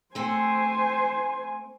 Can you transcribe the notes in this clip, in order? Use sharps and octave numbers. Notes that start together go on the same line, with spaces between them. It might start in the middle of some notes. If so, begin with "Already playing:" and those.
A3 C4 C5 G#5